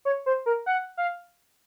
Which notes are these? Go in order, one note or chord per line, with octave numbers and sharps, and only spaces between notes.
C#5
C5
A#4
F#5
F5